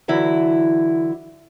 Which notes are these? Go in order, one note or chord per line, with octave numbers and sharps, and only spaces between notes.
D3 E3 F#3 E4